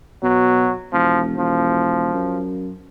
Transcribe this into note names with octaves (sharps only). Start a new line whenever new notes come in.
B2 F#3
E1 F3
E1 F3
F#2